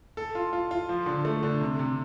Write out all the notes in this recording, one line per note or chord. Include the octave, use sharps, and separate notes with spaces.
A4
F4
F4
F4
F3
D3
A3
D3
C3
C3